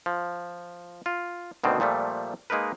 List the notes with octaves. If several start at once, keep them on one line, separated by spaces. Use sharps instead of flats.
F3
F4
D2 B2 D#3 C4 D4
A#2 F3 G3 A3
G#3 A#3 D#4 A#4 B4